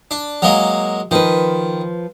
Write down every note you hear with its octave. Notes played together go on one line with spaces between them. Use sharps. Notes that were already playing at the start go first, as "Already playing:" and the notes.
D4
F#3 G#3 A#3
D#3 F3 B4